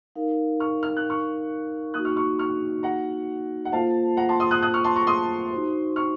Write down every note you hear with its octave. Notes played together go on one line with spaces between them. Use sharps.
D#4 A#4 F5
C#6 F6
F6
F#6
C#6 F6
A#3 D#4 F#4 D#6 F#6
C#6 F6
C#6 F6
C#6 F6
F#5 A#5
F#5
A#3 F4 A4 C5 F5 A5
F#5 A#5
A5 C6
C6 D#6
D#6 F#6
D#6 F#6
C#6 F6
A5 C6
A#5 C#6
C6 D#6
D#4 F#4 C5
C#6 F6